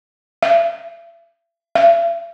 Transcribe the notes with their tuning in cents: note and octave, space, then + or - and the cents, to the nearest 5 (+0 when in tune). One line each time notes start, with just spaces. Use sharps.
E5 +40
E5 +45